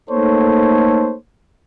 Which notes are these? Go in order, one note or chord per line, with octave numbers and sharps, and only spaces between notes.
A3 A#3 D#4 A4 C5 C#5